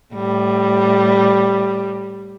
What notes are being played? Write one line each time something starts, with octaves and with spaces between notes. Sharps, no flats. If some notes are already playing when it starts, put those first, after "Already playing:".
A2 G3